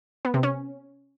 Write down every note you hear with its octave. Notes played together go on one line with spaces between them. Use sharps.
B3
C3
C#4